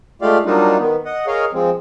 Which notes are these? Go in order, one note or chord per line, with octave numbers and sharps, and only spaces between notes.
G#3 A3 F4 G4 D5 F5
F#3 G3 A#3 D4 D#4 F4
D#3 B3
D#5 F#5
G#4 A#4 C#5 D#5 F5
F3 G#3 C4